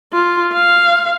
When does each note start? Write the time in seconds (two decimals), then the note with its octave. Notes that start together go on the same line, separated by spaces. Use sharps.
0.14 F4
0.53 F5